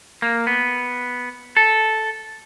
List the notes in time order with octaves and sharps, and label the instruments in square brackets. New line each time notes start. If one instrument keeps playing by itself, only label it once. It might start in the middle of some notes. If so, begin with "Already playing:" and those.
[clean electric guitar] A#3
B3
A4